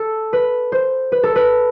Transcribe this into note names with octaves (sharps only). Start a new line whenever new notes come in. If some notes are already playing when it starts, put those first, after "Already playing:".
Already playing: A4
B4
C5
B4
A4
B4